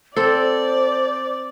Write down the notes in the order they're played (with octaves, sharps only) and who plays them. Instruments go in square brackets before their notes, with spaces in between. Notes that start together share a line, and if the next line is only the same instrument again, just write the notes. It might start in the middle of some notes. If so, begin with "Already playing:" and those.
[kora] C4 A4 [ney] C5 [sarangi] D5